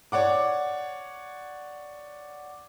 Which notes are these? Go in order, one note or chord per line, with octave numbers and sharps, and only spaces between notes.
C#5 D5 F#5 D6